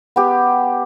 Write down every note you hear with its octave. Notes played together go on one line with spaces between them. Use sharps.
B3 G4